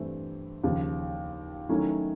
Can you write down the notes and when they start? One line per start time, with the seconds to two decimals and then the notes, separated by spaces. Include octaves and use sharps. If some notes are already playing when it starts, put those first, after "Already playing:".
Already playing: G2 E3 A3 C4
0.64 D#2 C#3 F3
1.69 D#3 F#3 A3 C#4 E4